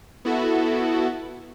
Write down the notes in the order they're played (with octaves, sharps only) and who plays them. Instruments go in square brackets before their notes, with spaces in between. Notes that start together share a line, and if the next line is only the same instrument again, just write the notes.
[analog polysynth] B3 E4 F#4 A4